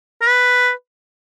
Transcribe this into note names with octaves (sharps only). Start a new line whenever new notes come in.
A#4
B4